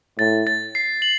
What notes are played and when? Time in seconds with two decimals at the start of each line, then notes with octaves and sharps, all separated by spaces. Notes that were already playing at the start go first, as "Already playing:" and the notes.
0.18 A2 A6
0.47 A6
0.75 C7
1.02 F#7